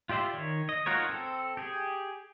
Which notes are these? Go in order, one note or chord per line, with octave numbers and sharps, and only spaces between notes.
F4 G4 D5 E5 C6
D#3 C#5
D#5
D#4 F4 F#4 A#4 C#5
C4 A4
G4 G#4